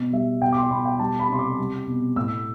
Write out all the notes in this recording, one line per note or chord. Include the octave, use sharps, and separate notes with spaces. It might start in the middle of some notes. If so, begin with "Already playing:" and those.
Already playing: B2
G3 E5
B2 G5
D6
C6
B2 B5
G5
G3 A5
B5
C3 C6
D6
G3
B2
A2 E6